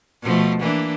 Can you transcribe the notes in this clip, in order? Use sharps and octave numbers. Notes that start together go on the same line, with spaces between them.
B2 F3 A3
E3 A#3 D4